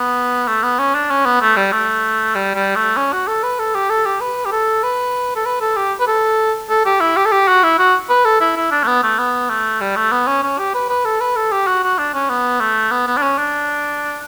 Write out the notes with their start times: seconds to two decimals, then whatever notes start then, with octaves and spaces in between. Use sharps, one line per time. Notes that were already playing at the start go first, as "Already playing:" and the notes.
Already playing: B3
0.48 A3
0.63 B3
0.79 C#4
0.95 D4
1.10 C#4
1.25 B3
1.41 A3
1.56 G3
1.72 A3
2.35 G3
2.55 G3
2.75 A3
2.97 C#4
3.12 F#4
3.27 A4
3.43 B4
3.59 A4
3.74 G4
3.90 A4
4.05 G4
4.20 B4
4.45 G4
4.52 A4
4.83 B4
5.36 A4
5.45 B4
5.61 A4
5.76 G4
5.99 B4
6.07 A4
6.69 A4
6.85 G4
7.00 E4
7.16 G4
7.25 A4
7.32 G4
7.48 F#4
7.63 E4
7.79 F#4
8.09 B4
8.25 A4
8.40 E4
8.56 E4
8.71 D4
8.83 A3
8.87 B3
9.03 A3
9.18 B3
9.49 A3
9.81 G3
9.96 A3
10.11 B3
10.27 C#4
10.43 C#4
10.58 G4
10.74 B4
10.89 B4
11.05 A4
11.20 B4
11.36 A4
11.52 G4
11.67 F#4
11.83 F#4
11.98 D4
12.14 C#4
12.29 B3
12.60 A3
12.91 B3
13.07 B3
13.17 D4
13.22 C#4
13.38 D4